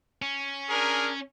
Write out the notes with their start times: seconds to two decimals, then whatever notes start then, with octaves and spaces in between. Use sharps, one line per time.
0.22 C#4
0.69 D4 G#4 A#4